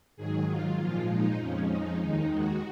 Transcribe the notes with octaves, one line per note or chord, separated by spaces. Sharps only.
G#2 D#3 F#3 G#4
F4
A#2 F3 G#3
D#4
F2 F3 G#3 C#4
D#4
D#2 D#3 G#3 D#4
F#4